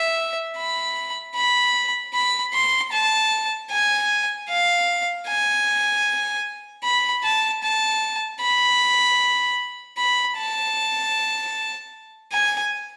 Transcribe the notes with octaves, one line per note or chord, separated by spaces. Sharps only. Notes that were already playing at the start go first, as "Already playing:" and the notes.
Already playing: E5
B5
B5
B5
C6
A5
G#5
F5
G#5
B5
A5
A5
B5
B5
A5
G#5